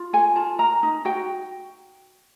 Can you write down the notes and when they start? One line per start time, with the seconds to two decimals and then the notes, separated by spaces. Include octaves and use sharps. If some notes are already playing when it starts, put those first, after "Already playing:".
Already playing: F4
0.13 A4 G#5
0.36 F4 A5
0.59 A#4 A#5
0.83 D#4
1.05 F#4 G5